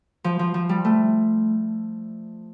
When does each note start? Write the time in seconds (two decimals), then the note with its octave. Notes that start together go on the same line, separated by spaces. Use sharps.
0.24 F3
0.39 F3
0.54 F3
0.69 G3
0.85 A3